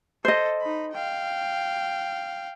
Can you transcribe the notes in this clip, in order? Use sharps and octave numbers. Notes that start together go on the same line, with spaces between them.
A4 C5 D#5
D#4 B5
F5 G5